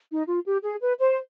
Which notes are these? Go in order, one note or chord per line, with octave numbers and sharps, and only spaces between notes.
D#4
F4
G4
G#4
B4
C5